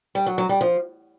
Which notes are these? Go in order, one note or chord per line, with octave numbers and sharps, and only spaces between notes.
G3
F#3
F#3
G3
F3